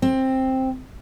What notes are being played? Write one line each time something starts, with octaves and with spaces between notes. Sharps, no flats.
C4